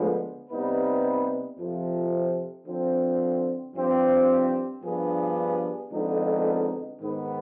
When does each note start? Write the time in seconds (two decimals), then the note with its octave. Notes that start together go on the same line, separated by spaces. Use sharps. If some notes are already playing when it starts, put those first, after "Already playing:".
Already playing: D2 D3 F3 G#3 B3
0.49 C3 G3 B3 D#4 B4
1.58 F2 C3 F3
2.66 D3 F3 C4
3.74 G2 F3 C4 G4
4.83 G2 F3 B3 D4 G#4
5.91 F2 D3 G#3 B3 D#4
6.99 G#2 D#3 B3